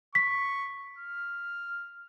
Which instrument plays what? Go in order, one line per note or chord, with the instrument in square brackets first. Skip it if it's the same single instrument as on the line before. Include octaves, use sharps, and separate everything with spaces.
[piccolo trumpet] C#6 [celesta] B6
[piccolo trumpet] F6